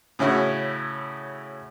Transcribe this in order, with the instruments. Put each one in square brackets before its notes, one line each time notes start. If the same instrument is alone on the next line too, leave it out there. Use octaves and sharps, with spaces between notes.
[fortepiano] A2 C#3 C#4 E4 F#4